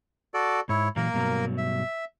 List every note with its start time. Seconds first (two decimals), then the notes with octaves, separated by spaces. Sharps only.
0.34 F#4 A4 D5
0.69 G#2 E4 C#5
0.96 A#2 E3 F#3 A#3 A#4
1.14 G2 B2 F#3
1.58 E5